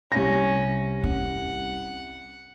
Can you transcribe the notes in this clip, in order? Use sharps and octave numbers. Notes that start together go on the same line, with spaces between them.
C2 C#4 A#6
C#4 F#5